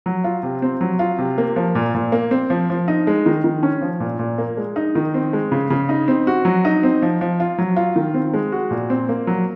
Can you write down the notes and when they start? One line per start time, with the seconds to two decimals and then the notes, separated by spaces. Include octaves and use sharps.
0.06 F#3
0.24 F4
0.43 C3
0.62 C4
0.81 F#3
0.99 F4
1.19 C3
1.38 A#3
1.56 F3
1.75 A#2
1.95 A#2
2.12 A#3
2.31 C4
2.50 F3
2.70 F3
2.88 D#4
3.07 G#3
3.26 D#3
3.44 D#3
3.63 C#4
3.82 F3
4.00 A#2
4.19 A#2
4.38 A#3
4.57 G#3
4.76 D#4
4.95 D#3
5.14 C4
5.33 G#3
5.52 C#3
5.70 C#3
5.89 D#4
6.08 C4
6.27 F#4
6.45 F#3
6.65 D#4
6.83 C4
7.02 F3
7.21 F3
7.40 F4
7.58 F#3
7.76 F4
7.96 D#3
8.14 C4
8.34 G#3
8.52 F#4
8.71 A#2
8.90 C4
9.09 A#3
9.27 F#3